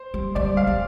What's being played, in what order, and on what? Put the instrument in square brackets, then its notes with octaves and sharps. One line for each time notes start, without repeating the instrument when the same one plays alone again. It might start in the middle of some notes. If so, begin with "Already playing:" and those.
Already playing: [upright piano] C5
[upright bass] G3
[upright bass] G3 [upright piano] D5
[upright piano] F5
[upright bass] G3